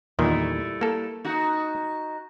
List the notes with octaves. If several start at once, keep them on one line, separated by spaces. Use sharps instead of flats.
E2 A#2 D#3 G3 A3 E4
A#3 A4
D#4 F#4